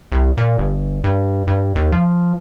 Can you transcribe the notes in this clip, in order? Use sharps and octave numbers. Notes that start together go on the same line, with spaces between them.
C2
A#2
G1
G2
G2
D#2
F3